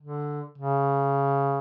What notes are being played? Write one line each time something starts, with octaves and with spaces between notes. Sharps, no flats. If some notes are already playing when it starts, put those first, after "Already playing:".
D3
C#3